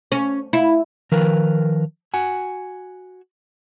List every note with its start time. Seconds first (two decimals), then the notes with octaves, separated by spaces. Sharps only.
0.12 C#4
0.53 E4
1.12 D#3 F3 A#4 B4 F5
2.14 F#4 F#5 G#5